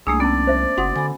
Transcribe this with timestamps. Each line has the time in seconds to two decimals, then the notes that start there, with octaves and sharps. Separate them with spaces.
0.07 C2 A3 A#3 D4 G#4 E6
0.20 B3 C#4 D5 A5
0.47 C5 E5
0.78 F#1 F#4 F#5 C6 D#6
0.96 D3 G#5 B5